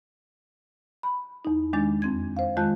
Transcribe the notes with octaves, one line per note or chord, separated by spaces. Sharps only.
B5
E2 D#4
D#3 G#3 D4 A6
F2 C4 G#6
C5 F5
D#3 G#3 F4 A5 F#6